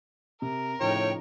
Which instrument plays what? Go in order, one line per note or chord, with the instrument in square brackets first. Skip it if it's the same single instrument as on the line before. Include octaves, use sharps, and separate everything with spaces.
[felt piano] C3 [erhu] A#4
[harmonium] A2 G5 [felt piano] C#3 F3 D#4 [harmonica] C#5